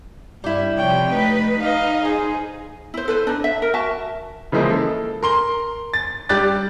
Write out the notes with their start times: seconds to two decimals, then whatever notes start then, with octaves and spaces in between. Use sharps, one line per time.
0.44 G2 G3 E4
0.77 C3 F3 C#5 G5
1.11 A3 D#4 B4
1.60 D#4 D#5 F5
2.05 G#4 C5
2.94 E4 C5
3.08 A4 B4 C5
3.27 D4 D#4
3.44 E5
3.62 A#4
3.74 F#4 E5 A5
4.52 C#3 E3 F3 G#3 A#3
4.70 A4
5.23 A#4 C6 G7
5.94 A6
6.29 G3 G4 D5 F#6 A6